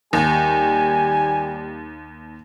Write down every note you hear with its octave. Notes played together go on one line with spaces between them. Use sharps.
D#2 G3 G4 G#5